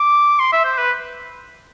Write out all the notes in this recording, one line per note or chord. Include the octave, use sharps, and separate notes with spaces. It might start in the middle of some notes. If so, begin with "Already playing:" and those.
Already playing: D6
C6
E5
C5
B4